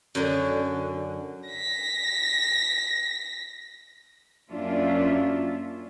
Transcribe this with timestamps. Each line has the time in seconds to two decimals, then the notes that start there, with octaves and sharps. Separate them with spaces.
0.15 F#2 D3
1.49 A#6 B6
4.50 F#2 A#3 C#4 D4 F4 E5